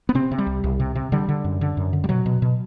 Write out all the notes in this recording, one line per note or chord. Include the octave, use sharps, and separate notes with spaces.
B3
C3 C4
C3
G3
C2
C2
C3
C3
D3 G3
D3
F#2
D3
F#2
D3
G3
B2 F#3
B2
B2